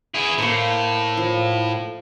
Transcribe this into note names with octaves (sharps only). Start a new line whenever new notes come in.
E4 G#4
A2 A#3 C5
F3